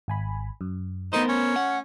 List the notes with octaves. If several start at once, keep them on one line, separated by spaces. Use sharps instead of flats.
G#1 G#5 B5
F#2
A3 B3 D#4 A#4 C5
C#4
F#5